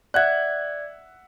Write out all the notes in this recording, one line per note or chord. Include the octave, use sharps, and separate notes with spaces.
D5 E5 F#5 F#6 G#6